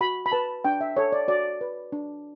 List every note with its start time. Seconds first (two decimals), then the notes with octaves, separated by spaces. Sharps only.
0.01 F#4 B5
0.26 B5
0.32 B4 A5
0.64 D4 G5
0.81 E5
0.97 A4 C#5
1.12 D5
1.28 F#4 D5
1.61 B4
1.92 D4